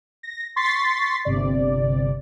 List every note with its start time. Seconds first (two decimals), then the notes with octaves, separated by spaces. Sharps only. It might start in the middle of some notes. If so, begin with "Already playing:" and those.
0.23 A#6
0.56 C6 C#6 A6 B6 C7
1.25 G1 C3 D5